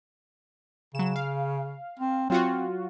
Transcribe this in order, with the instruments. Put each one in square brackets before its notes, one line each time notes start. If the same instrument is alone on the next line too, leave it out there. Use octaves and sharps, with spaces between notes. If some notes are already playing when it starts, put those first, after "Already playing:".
[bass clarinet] C#3 [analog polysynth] F#3 E7
[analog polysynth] F5
[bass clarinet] C4
[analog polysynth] F#3 F4 F#4 [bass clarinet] C4